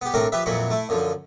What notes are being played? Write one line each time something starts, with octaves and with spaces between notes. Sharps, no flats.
B3 G4
A2 C4 D4 A#4 C#6
F3 G4 B4 E5
F2 A#2 E3 F#3 B5 C#6
A3 E4
F#2 D3 F3